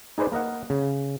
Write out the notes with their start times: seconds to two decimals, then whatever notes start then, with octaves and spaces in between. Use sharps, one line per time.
0.18 D#4 G#4 B4 C5 D5
0.32 A#3 A#4 D#5 F#5
0.70 C#3